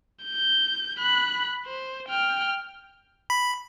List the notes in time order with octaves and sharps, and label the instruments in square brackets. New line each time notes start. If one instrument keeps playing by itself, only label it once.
[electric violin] G6
B5 F#6
C5
G5 F6
[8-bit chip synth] B5